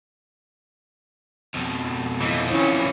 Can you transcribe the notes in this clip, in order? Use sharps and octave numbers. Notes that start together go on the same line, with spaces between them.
F2 B2
E3 F3 D#5
C2 C#4 E4